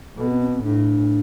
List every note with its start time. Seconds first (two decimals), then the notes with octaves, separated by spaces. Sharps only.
0.18 B2 A4
0.29 C4
0.41 C4
0.52 C4
0.63 A2 D4